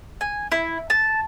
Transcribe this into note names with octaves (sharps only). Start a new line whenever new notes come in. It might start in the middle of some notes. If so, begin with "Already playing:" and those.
G#5
E4
A5